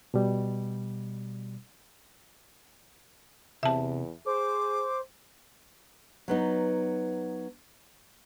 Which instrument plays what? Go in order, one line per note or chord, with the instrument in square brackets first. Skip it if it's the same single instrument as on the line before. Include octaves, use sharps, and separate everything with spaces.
[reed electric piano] B2 G3
[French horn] E2 [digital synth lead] C3 [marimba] E5 A5
[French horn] G#4 [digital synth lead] C5 [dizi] D6
[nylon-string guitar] F#3 B3 D#4